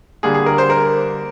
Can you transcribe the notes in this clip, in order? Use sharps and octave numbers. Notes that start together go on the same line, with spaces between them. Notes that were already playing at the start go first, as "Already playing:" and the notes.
D3 G3 A#3 G#4
G#4
A#4
C5
A#4